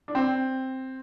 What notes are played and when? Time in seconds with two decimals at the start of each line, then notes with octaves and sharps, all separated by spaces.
0.08 D4
0.15 C4